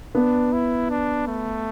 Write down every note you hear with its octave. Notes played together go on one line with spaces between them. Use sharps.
B3 D4
E4
D4
A3